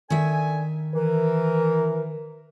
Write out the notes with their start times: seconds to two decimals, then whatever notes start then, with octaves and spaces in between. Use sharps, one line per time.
0.10 D#3 D4 A4 E5 G#5
0.94 E3 A#4